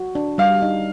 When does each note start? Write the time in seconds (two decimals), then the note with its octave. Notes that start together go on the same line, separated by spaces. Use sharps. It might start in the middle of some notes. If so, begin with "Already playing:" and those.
Already playing: F#4
0.15 D4
0.38 G3 F5
0.62 D#4